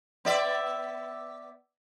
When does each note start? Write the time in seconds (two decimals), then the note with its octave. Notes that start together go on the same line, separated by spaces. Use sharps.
0.25 B3 D5 E5